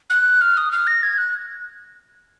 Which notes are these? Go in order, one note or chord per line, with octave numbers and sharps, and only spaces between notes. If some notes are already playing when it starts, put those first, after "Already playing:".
F#6
F6
D#6
F6
A#6
G#6
F#6